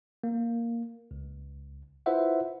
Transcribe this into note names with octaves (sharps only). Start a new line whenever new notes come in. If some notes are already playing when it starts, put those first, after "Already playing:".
A#3
C#2
E4 F4 B4 C5 E5 F#5